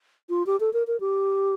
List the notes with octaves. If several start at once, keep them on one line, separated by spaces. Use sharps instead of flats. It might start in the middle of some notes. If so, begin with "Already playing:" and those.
F4
G4
A4
A#4
A#4
G4